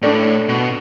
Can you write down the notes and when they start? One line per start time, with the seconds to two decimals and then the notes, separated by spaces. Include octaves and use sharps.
0.02 A2 A3 D4 A4 D5
0.49 B2